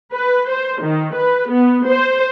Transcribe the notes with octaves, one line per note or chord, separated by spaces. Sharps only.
B4
C5
D#3
B4
B3
C5